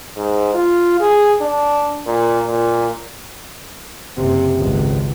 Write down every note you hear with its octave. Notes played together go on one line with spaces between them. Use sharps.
G#2
F4
G#4
D4
A#2
A#2
F#1 C3
G#1 C#2